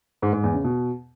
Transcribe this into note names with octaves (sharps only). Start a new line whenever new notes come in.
G#2
G#2
E2
C#3
B2